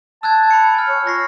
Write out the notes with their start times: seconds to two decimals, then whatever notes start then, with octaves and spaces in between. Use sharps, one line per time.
0.23 A5 E6 F#6 G#6
0.51 B5 C#7
0.74 G#5 F6
0.88 C#5
1.06 F4 C#6 A#6 C7